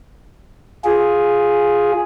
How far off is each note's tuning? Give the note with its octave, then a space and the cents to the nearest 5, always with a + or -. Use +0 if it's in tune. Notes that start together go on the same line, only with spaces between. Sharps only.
F4 +10 G#4 +0